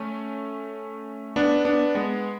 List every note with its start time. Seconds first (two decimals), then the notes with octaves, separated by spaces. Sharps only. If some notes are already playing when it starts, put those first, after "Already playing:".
Already playing: A3 C#4
1.36 B3 D4
1.65 B3 D4
1.95 G#3 B3